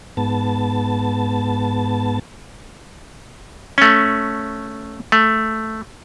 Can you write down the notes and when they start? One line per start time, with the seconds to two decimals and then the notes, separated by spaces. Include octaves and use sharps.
0.17 G#2 B3 A5
3.78 A3 C#4
5.12 A3